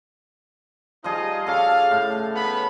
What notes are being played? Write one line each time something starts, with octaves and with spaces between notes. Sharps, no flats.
F3 G3 D#4 F4 G#4 D#5
C#3 A4 D5 F5
A2
B3 B5